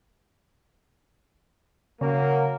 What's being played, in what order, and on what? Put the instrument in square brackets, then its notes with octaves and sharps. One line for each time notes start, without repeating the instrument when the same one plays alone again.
[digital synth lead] C#3 [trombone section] F#3 A#3